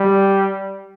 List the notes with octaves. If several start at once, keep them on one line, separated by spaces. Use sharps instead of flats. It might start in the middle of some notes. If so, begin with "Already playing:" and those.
Already playing: G3